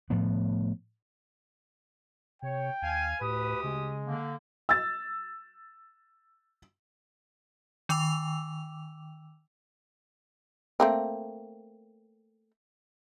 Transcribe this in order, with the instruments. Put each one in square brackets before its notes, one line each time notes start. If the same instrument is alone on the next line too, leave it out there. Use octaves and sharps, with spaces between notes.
[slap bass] A2 F3 B3
[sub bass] C3 [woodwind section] C#5 [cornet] G5
[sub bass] D#2 [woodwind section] F5 G#5
[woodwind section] D2 G4 D#6 [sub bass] A2 [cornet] B4
[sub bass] C#3 [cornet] G#3
[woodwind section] D3 A#3
[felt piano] E6 A6
[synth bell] D#3 G5 D6 E6 F7
[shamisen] A3 A#3 C4